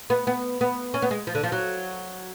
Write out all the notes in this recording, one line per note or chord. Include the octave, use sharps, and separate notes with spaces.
B3
B3
B3
C#4
B3
G#3
F3
D3
F3
F#3